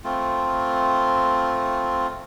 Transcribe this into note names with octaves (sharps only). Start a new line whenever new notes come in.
A3 C4 F4